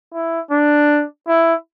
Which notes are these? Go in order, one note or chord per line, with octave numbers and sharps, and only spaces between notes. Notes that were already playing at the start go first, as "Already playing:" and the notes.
E4
D4
E4